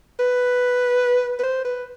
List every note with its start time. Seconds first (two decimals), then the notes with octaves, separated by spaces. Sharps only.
0.19 B4
1.39 B4
1.43 C5
1.65 B4